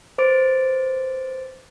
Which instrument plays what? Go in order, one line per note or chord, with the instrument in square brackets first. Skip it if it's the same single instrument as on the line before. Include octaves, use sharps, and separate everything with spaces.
[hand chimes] B4 C5 D6 A6 D7